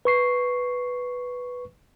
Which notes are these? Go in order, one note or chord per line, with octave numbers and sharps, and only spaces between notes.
B4 C#6 C7